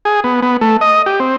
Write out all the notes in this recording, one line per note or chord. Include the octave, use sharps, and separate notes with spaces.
G#4
B3
B3
A3
D#5
G4
C4